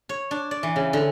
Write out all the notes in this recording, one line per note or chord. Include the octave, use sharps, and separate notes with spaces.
C#5
D4
D5
E3
C#3
D3